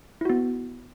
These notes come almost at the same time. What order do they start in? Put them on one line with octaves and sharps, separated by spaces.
E4 F#4 B3